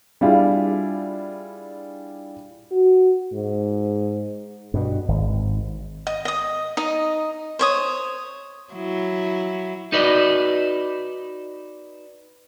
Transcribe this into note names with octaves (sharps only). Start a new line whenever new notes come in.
G3 D4 E4 F4 G#4
F#4
G#2
G2 B2
G#1
D#5
D#5 D#6
D#4 D#5
C5 C#5 D#6
F#3 E4
D#4 F#4 B4 D5 D#5